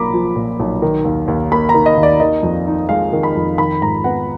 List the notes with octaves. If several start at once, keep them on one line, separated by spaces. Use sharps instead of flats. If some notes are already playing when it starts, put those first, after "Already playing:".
Already playing: B1 A#2 A#3 A#5 B5 D6
F3
A#2
B1
D#3
D#2
D#2
A#3 B5
A#5
D#3
D#5
D#2
D5
D#3 D#5
F2
D#4
G#3 F5
D#3
B5
F2
D#3 B5
G#2 A#5
B3 F#5